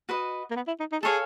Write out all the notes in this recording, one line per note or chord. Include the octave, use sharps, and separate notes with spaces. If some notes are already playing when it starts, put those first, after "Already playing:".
F#4 B4 D#5
A#3
B3
E4
D#4
D#4
G#4 A4 C#5 F5 G#5